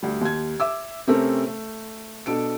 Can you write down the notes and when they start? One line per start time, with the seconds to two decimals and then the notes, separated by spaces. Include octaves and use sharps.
0.03 D2 G3
0.21 D#2 G#6
0.60 E5 D6 E6
1.07 C3 A3 C4 C#4 A4 A#4
1.46 A3
2.26 B2 D4 A4 D7